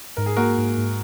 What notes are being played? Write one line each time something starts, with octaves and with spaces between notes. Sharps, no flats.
G#2 A#4
G#4
A#3 F#4 A#4
G#2
G#2